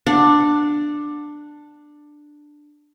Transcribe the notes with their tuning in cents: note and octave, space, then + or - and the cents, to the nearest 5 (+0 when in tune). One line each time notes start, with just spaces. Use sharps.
D4 +10 F#5 -25